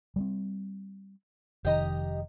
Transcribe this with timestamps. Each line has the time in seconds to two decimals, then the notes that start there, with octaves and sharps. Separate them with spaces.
0.16 G3 G#3 C4
1.65 F1 D#3 G4 D#5 A#5